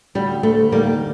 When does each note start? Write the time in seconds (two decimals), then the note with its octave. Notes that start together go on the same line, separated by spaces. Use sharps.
0.15 D2 G3
0.43 D2 A3
0.71 D#3 G3 A#3